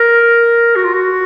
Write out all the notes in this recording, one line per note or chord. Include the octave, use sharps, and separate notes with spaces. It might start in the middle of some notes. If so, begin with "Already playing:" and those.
Already playing: A#4
F#4
F4
F#4